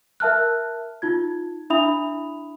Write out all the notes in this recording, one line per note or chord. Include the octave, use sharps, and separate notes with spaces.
A#4 E5 A5 F6 F#6
D#4 F4 G#6
D4 E4 E5 B5 D#6 F7